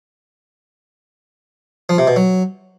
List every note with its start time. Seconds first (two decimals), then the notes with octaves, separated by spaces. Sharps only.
1.89 F3
1.98 C3
2.07 B2
2.16 F#3